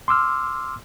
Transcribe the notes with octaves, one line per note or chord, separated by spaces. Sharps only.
C6 D6 E6 F6